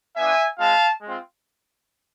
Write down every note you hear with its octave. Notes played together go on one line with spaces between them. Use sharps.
B3 D4 F4 E5 G#5
G#3 C4 F4 F5 A5
G#3 C4 F4